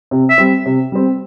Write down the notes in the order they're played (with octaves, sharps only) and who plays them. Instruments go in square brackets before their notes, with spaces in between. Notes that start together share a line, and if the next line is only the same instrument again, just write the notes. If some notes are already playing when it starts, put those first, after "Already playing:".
[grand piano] C3
[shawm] E5
[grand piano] G3 C4
C3
G3 C4